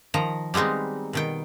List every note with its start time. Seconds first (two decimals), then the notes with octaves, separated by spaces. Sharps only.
0.14 D#3 F3 A#5
0.54 G3 G#3 B3 C4 D#4
1.13 B2 D#3 G5